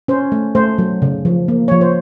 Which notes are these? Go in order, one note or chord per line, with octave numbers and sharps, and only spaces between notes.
C#4 C5
A3
A3 C5
F#3
C#3
F3
A#3
F3 C#5
C5